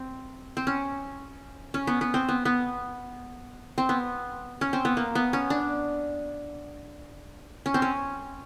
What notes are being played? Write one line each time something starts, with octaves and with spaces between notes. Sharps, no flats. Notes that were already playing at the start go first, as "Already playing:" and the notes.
Already playing: C4
C4
C#4
C#4
B3
B3
C4
B3
B3
C4
B3
C#4
C4
B3
A#3
B3
C#4
D4
C#4
C4
C#4